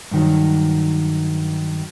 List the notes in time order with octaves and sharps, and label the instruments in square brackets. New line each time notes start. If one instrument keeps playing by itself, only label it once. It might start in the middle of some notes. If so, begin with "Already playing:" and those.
[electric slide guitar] G2 D#3 F#3